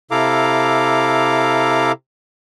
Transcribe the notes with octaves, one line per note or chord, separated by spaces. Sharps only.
C3 E4 A4 F5 A#5 D6